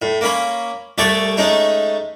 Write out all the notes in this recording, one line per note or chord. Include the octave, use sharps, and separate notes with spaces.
A2
A#3 C#4 B5
C2 A3 A4 C#5 D5
G#3 A3 C#4 D#4